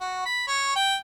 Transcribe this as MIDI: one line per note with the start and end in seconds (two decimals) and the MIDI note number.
0.01 0.21 66
0.26 0.44 83
0.47 0.75 73
0.76 0.96 79